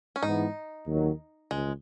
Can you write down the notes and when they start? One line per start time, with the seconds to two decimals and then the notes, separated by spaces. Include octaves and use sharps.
0.16 C#4
0.23 G#2 E3 B3 D#4
0.87 D#2 D#3 F#3
1.51 C#2 G#3